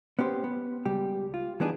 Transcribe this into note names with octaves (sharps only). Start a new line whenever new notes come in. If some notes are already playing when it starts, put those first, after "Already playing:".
B3 C#4 G4 C5
B3
C#2 G3 G4
F4
E3 G3 B3 D4 D#4 G#4